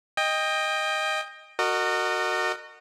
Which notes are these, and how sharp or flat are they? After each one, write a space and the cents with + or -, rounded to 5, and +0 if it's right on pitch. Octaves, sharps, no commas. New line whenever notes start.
D#5 +0 G5 +25
F#4 +0 A#4 -30 D#5 -30